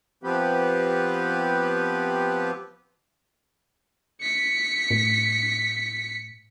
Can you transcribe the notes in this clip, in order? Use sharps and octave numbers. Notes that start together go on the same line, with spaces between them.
F3 B3 C4 G4 B4
B6 C#7
A2